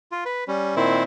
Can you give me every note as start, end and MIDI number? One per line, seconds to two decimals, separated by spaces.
0.12 0.24 65
0.25 0.44 71
0.48 0.75 55
0.48 0.75 61
0.76 1.03 46
0.76 1.03 51
0.76 1.03 60
0.76 1.03 64